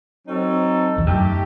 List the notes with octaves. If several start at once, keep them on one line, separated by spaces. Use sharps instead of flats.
F#3 C4 D#4 A4
E2
F#2 A3 D#4 G4